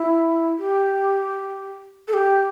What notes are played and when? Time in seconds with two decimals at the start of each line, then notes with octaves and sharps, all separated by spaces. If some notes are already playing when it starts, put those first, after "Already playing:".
Already playing: E4
0.59 G4
2.08 A4
2.14 G4